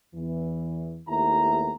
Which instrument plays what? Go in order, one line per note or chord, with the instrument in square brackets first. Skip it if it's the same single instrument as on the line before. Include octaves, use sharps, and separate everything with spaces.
[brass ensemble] E2 E3
D#2 A3 B3 E4 G4 A#5